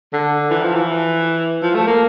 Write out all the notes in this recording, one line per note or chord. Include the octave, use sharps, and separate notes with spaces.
D3
E3
F3
E3
F3
A3
A#3